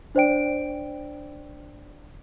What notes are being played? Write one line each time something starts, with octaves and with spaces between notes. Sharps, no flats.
D4 C5 D5 G5 D7